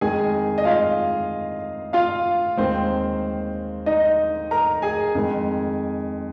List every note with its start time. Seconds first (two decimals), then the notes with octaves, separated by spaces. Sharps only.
0.01 F2 D#3 G#3 G#4 G#5
0.58 D#5
0.65 F4 F5
1.93 F4 F5
2.57 D#2 D#3 G#3 C4 C5
3.86 D#4 D#5
4.51 A#4 A#5
4.82 G#4 G#5
5.15 F2 D#3 G#3